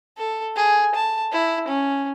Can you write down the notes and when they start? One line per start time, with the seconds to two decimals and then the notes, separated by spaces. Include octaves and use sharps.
0.17 A4
0.56 G#4
0.95 A5
1.32 E4
1.68 C#4